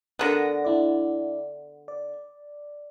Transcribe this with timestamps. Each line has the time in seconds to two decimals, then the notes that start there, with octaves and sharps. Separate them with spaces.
0.19 D3 B3 A#4 A#6
0.64 D4 E4 D5
1.88 D5